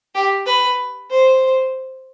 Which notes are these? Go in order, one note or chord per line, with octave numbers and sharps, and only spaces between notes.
G4
B4
C5